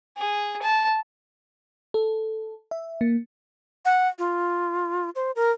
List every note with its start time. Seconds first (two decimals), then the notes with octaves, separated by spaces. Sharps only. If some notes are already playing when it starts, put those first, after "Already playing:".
0.17 G#4
0.62 A5
1.94 A4
2.71 E5
3.01 A#3
3.85 F#5
4.18 F4
5.15 C5
5.36 A#4